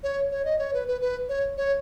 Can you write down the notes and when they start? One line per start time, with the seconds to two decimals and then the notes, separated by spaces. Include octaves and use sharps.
0.03 C#5
0.31 C#5
0.45 D#5
0.59 C#5
0.74 B4
0.88 B4
1.01 B4
1.29 C#5
1.57 C#5